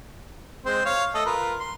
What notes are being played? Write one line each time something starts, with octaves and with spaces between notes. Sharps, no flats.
G#3 C4 C5
C#5 F5
A3 A4 D#5
F4 A#4 B4
C6